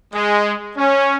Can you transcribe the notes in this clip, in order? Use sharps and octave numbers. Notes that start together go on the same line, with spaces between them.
G#3
C#4